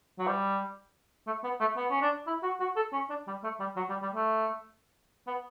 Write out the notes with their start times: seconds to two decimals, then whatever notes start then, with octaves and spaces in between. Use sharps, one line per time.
0.18 F#3
0.27 G3
1.27 A3
1.44 B3
1.60 A3
1.76 B3
1.90 C#4
2.02 D4
2.27 E4
2.43 F#4
2.60 F#4
2.76 A4
2.93 C#4
3.10 D4
3.27 G3
3.43 A3
3.60 G3
3.76 F#3
3.90 G3
4.02 G3
4.14 A3
5.27 B3